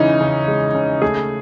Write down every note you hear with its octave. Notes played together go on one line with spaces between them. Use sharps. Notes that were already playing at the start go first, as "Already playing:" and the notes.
Already playing: C#3 E3 G#3 C#4 D#4
C#3
G#3
C#3
A3 G#4